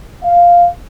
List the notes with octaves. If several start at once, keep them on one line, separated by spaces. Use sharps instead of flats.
F5